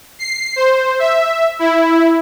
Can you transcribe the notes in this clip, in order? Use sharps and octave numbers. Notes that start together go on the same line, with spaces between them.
C7
C5
E5
E4